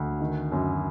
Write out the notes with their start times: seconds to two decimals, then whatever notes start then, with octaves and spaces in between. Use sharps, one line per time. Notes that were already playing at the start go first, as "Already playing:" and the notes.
Already playing: D2
0.20 D#3
0.52 F#2